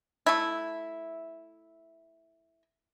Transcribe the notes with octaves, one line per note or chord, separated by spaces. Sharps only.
A3 E4